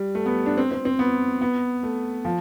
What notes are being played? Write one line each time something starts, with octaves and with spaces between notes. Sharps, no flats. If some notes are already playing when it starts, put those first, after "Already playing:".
Already playing: G3
A3
B3
D4
C4
C4
C4
B3
B3
A3
F3